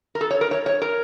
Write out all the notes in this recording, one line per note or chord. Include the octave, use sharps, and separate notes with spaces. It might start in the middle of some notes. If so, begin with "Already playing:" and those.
A#4
A4
C#5
A#4
C#5
C#5
A#4